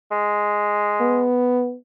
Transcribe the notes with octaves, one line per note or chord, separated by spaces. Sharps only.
G#3
B3